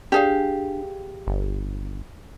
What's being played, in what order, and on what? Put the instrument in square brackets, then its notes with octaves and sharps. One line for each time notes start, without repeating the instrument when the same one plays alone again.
[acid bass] D4 [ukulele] G4 G#4 F5
[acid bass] G1